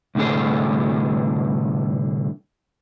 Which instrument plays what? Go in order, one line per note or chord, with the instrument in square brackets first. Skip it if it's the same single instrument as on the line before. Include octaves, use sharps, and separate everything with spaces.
[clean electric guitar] C2 A2 D3 G#4